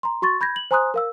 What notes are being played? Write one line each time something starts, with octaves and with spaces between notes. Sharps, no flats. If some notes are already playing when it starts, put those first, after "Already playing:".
A#5 C6
F#4 C6 C#6 A6
B5 G6 G#6 A#6
F#7
C5 G#5 A#5 C6 D#6 F#6
A#4 F5 E6